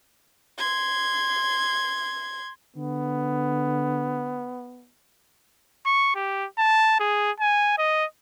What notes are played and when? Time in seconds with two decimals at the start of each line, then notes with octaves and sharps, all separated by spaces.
0.58 C6 G#6
2.76 D3 B3
5.86 C#6
6.15 G4
6.58 A5
7.00 G#4
7.40 G#5
7.78 D#5